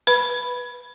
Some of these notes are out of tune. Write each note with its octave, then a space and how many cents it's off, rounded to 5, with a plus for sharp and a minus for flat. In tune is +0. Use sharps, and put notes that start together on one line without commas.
B4 +0 B5 +0